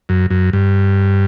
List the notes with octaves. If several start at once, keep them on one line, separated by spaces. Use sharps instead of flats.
F#2
F#2
G2